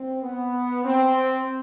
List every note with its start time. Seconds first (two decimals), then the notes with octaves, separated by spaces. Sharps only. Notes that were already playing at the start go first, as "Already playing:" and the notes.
Already playing: C4
0.23 B3
0.85 C4